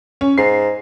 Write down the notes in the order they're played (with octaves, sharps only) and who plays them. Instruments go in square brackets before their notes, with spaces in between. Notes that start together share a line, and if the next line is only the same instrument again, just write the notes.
[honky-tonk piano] C#4
[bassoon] G#2 [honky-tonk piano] C7